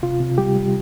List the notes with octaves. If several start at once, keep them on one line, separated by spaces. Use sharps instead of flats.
C3 F4
C3
G3 G4
G3